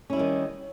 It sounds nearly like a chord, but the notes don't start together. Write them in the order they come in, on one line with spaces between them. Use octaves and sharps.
C#4 E4 G3 D#3